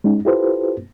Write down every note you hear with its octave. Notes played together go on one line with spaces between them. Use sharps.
G#3 C#4 D#4
E4 F4 G4 A4 B4 C5